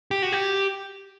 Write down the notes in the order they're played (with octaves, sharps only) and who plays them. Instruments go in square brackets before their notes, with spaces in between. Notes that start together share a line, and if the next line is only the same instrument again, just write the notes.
[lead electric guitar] G4
F#4
G4